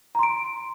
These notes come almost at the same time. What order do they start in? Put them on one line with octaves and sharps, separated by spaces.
A#5 C6 D7